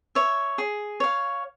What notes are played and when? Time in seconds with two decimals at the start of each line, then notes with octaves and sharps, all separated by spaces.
0.15 C#5 E5
0.58 G#4
1.00 C#5 F5